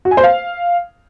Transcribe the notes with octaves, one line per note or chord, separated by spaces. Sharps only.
F#4
G#5
C5
F5